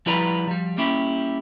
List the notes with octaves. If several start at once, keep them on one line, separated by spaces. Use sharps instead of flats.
F3 G3 E4 B4 D5 A#5
F3 G3
G3 A#3 C#4 E4 G4